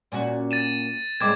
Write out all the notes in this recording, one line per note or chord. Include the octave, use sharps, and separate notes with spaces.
A#2 C#4 F#4
A6 D#7 E7
A2 G#3 C4 D6 G#6